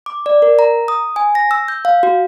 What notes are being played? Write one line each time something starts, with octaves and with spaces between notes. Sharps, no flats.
D6
D5
A#4
A#5
D#6
G#5
A#6
E6
G6
F5
F#4